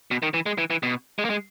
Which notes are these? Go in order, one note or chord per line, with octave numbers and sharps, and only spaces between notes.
B2
D#3
E3
G#3
E3
E3
B2
G#3
A#3
G#3